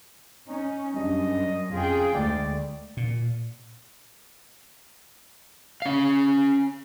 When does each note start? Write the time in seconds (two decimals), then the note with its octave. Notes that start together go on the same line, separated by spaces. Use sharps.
0.48 C#4 D#4
0.96 F#2 G3 C#4 D4 D#5
1.72 F2 C#4 F4 G#4 G5
2.15 D2 G#3 D5
2.97 A#2
5.82 C#4 F5